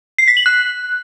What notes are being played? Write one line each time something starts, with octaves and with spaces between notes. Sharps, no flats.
C7
B6
F#7
F#6